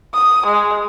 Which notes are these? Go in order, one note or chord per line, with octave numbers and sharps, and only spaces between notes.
D#6
G#3